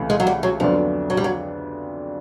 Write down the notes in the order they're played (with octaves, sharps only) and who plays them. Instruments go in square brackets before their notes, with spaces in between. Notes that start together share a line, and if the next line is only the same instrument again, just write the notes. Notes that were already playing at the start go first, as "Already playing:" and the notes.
Already playing: [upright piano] C#2 C3 E3 A3
[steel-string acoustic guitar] G#3
F#3
G3
F#3
[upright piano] F2 D3 F#3 B3 D4 [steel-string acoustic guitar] F3
[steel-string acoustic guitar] F#3
G3
F#3